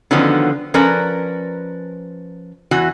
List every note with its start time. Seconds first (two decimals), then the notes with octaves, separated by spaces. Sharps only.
0.11 D3 D#3 F3 F#3 B3 C#4
0.74 F3 C#4 A#4 B4 D5
2.71 E2 E3 F#4